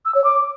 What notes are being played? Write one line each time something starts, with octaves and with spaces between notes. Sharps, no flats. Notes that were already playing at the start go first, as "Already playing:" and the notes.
E6
C#5
D6